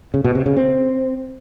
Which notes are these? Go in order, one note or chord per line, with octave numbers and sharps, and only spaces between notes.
C#3
B2
C3
C#3
C4